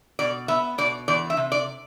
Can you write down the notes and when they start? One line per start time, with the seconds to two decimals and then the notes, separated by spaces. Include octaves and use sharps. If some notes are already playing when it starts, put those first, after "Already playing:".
0.19 B2 D5
0.48 B3 E5
0.78 B2 D5
1.08 E2 D5
1.30 E5
1.37 C3
1.52 D5